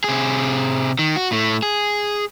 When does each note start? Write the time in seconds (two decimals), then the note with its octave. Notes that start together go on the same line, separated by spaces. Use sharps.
0.04 C3 G#4
0.99 D#3
1.16 F#4
1.31 A2 A3
1.63 G#4